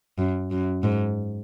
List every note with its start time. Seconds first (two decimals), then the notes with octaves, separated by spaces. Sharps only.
0.18 F#2
0.51 F#2
0.83 G#2